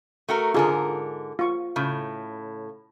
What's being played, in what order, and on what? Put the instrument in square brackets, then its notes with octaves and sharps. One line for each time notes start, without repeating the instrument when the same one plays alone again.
[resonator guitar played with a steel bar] A3 F#4 A#4
[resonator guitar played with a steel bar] G#2 D3 A#4 [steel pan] F4 G#4
[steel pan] F4 C#6
[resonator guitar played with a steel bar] A2 C#3